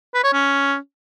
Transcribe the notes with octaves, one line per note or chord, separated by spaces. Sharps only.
B4
C#5
C#4